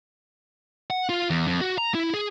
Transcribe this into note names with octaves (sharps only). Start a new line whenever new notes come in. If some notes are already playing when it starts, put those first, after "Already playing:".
F#5
F4
E2
F2
F#4
A#5
E4
G#4